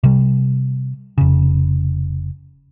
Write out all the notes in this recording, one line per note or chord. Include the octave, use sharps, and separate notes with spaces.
C3 G3
F1 C#3